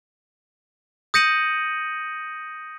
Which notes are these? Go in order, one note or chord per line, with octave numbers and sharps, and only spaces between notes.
D#6 G6 A#6 C#7 D#7 F#7